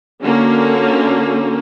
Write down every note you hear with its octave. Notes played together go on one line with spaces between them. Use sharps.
D3 A#3 C#4 F#4